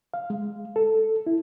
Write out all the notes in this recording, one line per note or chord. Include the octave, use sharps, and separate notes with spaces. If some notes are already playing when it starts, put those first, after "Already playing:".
F5
G#3
A4
E4